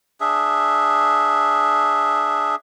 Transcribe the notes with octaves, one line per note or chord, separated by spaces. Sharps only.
D4 G#4 E5